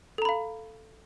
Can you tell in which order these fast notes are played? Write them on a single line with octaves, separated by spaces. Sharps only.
A4 A#5 B5 F5